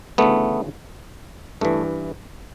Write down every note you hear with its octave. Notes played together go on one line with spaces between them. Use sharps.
D2 C#3 E3 A3 B3
G2 E3 A3